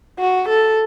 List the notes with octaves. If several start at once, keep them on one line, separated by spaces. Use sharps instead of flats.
F#4
A4